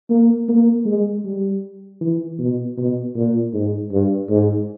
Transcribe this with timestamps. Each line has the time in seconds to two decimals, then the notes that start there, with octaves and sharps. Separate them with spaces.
0.10 A#3
0.49 A#3
0.86 G#3
1.25 G3
2.01 E3
2.39 B2
2.77 B2
3.16 A#2
3.54 G#2
3.91 G2
4.30 G#2